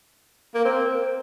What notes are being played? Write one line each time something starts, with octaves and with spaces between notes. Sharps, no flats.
A#3
C4